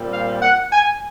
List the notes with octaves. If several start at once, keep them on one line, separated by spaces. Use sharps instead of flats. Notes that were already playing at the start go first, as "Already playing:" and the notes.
Already playing: A#2 G3 C4
F5
F#5
G#5